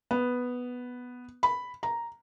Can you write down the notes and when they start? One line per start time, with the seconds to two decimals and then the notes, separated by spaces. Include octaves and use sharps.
0.11 B3
1.43 B5
1.83 A#5